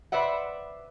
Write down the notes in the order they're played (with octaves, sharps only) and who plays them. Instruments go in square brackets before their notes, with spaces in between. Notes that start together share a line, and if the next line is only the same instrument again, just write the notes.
[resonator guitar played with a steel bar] B4 C5 D5 E5 F#5